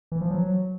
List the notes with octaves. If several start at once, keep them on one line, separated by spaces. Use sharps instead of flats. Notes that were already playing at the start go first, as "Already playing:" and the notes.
E3
F3
F#3